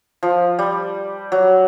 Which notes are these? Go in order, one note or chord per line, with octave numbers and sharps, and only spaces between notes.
F3
G3
F#3